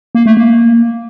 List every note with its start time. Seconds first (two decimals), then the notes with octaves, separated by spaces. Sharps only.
0.15 A#3
0.26 A3
0.37 A#3